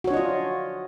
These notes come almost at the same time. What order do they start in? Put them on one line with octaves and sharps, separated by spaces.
F#4 C#5 D4 D#5 F4